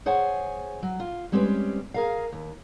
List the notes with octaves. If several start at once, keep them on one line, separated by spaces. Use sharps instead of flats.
G#4 C5 C#5 F#5 G#5
F#3
F4
G3 G#3 C4 C#4 G4 B4
G#4 A#4 F5
D#2